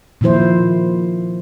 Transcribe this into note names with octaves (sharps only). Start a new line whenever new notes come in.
A#2 D#3 F3 E4 C5